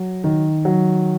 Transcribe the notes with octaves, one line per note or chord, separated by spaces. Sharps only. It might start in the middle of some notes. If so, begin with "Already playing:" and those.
Already playing: F#3
D#3
F#3